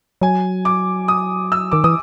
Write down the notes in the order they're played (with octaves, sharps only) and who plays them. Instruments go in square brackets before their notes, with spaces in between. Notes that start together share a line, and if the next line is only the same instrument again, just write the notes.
[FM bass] F#3 [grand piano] G#5
[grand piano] D6
D#6
E6
[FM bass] D#3 [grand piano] D6
[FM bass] E3 [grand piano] D#6